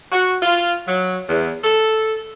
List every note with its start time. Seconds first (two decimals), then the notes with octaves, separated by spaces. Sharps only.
0.12 F#4
0.43 F4
0.87 F#3
1.28 E2
1.64 A4